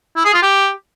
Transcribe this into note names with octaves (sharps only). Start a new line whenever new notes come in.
E4
G#4
F4
G4